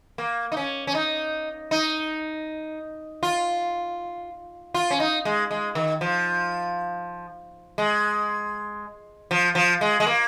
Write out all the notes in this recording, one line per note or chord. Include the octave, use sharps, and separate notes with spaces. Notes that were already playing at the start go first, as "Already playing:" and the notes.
A#3
D#4
C#4
C#4
D#4
D#4
F4
F4
C#4
D#4
G#3
G#3
D#3
F3
G#3
F3
F3
G#3
G#3
A#3